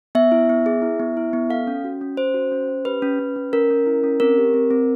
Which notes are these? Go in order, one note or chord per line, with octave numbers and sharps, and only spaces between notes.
B3 E5
E4
B3
G#4
E4
B3
E4
B3
A4 F5
C#4
F#4
C#4
C#4 C5
F#4
C#4
C#4
G4 B4
C#4
C#4
C#4
C#4 A#4
C#4
E4
C#4
C4 A#4
G4
C4
C4